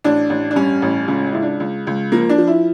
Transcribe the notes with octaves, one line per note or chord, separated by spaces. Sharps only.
A1 D4
A1
D4
G2 C#4
A1
C#2 C#4
C#2 E4
D4
C#2
C#2
F3 A#3
D4
F3
E4